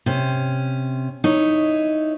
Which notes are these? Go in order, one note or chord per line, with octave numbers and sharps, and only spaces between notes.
C3 C#4
D#4 E4 C#5